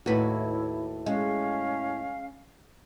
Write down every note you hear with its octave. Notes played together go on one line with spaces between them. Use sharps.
D#2 A2 E4 F#4 B4 C#5
G#3 C#4 F5